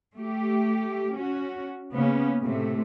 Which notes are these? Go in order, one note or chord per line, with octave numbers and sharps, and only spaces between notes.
A3 G4
C#4 F#4
C#3 A#3 B3 C#4
A2 C3 A3